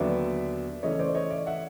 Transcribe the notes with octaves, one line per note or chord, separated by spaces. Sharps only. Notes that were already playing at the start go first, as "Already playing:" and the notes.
Already playing: D#2 D3 F#3 B3 D5 E5
C#3 E3 A3 C#4 C#5 D#5
C5 D5
C#5 D#5
D5 E5
E5 F#5